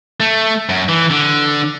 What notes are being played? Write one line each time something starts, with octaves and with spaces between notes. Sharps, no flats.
A3
F#2
E3
D3